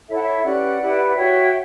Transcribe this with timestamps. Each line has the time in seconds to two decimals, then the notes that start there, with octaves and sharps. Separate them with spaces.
0.08 E4 A4 C#5 E5
0.16 F#5
0.22 C#5 E5
0.44 C#4 G4 B4 D5 F#5
0.80 E4 G4 B4
1.15 F#4 C#5 E5 G5